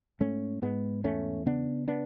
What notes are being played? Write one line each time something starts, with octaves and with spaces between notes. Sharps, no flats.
G#2 A3 C#4
G#2 G#3 B3
E2 A3 C#4
C#3 B3 D4
B3 D4